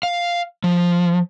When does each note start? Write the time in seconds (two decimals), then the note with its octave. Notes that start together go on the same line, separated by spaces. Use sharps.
0.03 F5
0.64 F3